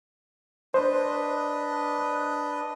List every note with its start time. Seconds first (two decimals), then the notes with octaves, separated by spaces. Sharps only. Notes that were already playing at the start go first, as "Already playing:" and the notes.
0.74 D4 B4 C5 D#5